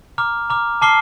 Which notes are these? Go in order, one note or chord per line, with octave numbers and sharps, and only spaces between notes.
A#5 D6 F6
A#5 D6 F6
A5 D6 F6 C7 G7